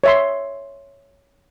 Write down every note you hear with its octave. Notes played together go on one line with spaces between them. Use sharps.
C#5 E5 C6